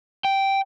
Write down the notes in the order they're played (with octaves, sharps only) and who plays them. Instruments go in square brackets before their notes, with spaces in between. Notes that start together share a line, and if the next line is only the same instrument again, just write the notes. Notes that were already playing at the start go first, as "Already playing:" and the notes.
[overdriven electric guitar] G5